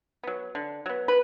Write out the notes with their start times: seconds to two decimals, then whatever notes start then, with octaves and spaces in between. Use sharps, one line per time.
0.24 F#3 B3
0.55 D3
0.86 F#3 B3
1.08 B4